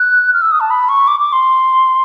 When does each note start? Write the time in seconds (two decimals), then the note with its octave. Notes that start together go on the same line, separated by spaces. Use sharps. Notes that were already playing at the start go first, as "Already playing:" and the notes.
Already playing: F#6
0.33 F6
0.42 E6
0.51 D#6
0.60 A5
0.70 B5
0.89 C#6
1.08 D6
1.20 D6
1.33 C6